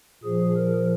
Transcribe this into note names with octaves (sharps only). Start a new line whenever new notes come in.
A#2 F3 G#4
A#4